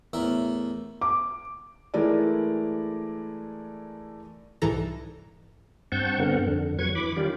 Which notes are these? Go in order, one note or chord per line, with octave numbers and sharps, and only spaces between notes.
E2 A2 A#4 E5
D6
E3 G#3 A3 E4 A#4 D5
C2 G#2 E3 A4 A#5 A#6
G2 C4 F#5 A5 C#6 G6
G2 D3 B3 C4 A#4 F#5
F2 D3
F2 F#3 B4 C#6 G#6
E3 B5 D6
D#3 G3 C#4 F4 G4